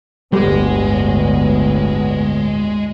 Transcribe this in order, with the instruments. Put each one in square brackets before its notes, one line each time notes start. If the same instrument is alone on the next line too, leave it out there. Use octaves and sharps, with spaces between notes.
[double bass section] G1 D2 A2 [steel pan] G3 G4 [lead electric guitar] G#3 [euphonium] B3